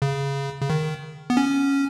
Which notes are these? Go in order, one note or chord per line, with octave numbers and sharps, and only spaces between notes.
C#3
C#3
D#3
B3
C#4